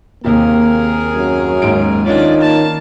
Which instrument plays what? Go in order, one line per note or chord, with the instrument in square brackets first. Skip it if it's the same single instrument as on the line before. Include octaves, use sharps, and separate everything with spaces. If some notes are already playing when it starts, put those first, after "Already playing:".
[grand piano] D#2 C3 [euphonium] A#3 [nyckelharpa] G#4 A#4
[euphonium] F#2
[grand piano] D#2 G#2 D7
[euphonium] D#3 [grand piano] C#4 F4 D#5 [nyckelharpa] D4 D5
[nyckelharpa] A#3 A5